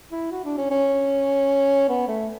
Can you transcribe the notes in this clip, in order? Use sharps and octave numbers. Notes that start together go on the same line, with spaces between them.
E4
F#4
D4
C#4
C#4
B3
A3